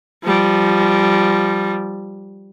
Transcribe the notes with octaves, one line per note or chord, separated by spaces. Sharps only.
F3 G3